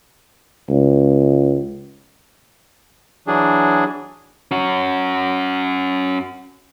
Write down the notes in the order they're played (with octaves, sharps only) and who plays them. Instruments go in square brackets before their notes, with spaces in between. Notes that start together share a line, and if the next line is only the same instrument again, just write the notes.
[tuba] C#2
[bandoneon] E3 F#3 D4 G#4
[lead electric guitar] C#4 F#4